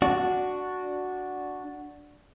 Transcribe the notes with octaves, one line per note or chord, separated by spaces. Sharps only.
D4 F#4